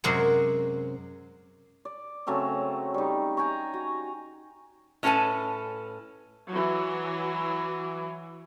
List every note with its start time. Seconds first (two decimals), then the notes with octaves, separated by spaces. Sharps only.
0.04 F#2 C3 G#3 F#4 A#4 C#5
1.85 D5
2.27 C#3 F#3 A3 C4
2.94 G3 D#4
3.37 G5 G#5 A#5 C#6
3.74 F#4
5.03 A2 C#4 A4 B4 G#5 A5
6.50 E3 F#3